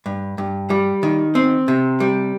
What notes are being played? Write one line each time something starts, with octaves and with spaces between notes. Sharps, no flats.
G2
G2
G3
D#3
C4
C3
G3